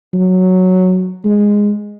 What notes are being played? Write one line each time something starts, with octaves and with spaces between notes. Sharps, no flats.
F#3
G#3